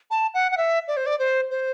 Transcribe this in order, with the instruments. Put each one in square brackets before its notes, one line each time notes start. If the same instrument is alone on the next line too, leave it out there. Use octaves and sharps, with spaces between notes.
[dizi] A5
F#5
F#5
E5
D5
C5
D5
C5
C5